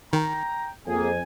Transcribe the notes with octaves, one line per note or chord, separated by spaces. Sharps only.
D#3 G5 A#5
F2 A#3 G#4 G#5